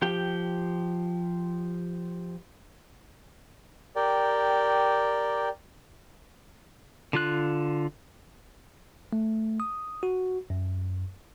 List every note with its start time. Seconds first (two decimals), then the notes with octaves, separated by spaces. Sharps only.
0.02 F3 G4 G5
3.96 G4 A#4 D5 G5
7.13 D3 F4 F#6
9.13 A3
9.60 D#6
10.03 F#4
10.50 F#2